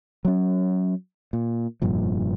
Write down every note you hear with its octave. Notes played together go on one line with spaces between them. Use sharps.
F#3 C#4
A#2
F1 G2 A#2 F3